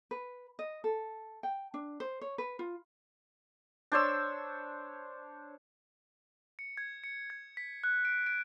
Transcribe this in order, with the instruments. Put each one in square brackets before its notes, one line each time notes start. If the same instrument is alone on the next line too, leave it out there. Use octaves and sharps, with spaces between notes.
[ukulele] B4
D#5
A4
G5
D4
C5
C#5
B4
F4
[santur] D4 C5 C#5 E6
[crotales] C#7
G#6
C#7
G#6
B6
F#6
D7
D7